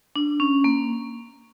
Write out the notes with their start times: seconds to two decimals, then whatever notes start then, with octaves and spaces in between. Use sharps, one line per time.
0.16 D4
0.40 C#4
0.64 A#3